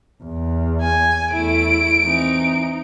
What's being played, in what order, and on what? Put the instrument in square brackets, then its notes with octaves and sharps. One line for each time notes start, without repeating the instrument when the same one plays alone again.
[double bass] E2
[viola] G#5
[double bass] E2 [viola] A3 E4 [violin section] D7
[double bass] E3 C4 [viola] D#4